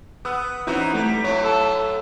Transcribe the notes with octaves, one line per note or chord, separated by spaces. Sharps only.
B3 D#6 E6 F#6
E3 C4 C#4 D#4 E4 F#4
G3 A3
A2 F#3 C#5
A4